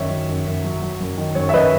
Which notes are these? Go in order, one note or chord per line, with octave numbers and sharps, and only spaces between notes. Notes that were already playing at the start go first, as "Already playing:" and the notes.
Already playing: F#2 D#3 C#5 E5
F#3
F#2
F#2
F#3
F#3
F#2
D#3
F#2 C#5
E5
F#2 B4 D#5